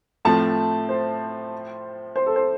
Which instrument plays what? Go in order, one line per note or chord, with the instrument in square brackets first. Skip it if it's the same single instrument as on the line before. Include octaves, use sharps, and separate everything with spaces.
[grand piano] A2 F3 A3 C4 [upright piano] A5
[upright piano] C5
C5
A4
C5